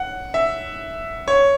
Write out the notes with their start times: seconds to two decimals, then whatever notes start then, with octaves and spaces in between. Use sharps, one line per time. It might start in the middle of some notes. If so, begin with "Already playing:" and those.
Already playing: F#5
0.34 E5
1.28 C#5